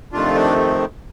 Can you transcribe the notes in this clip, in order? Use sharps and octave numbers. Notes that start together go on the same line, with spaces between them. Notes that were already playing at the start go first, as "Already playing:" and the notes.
F2 C3 D#3 A3 D4 F4
D4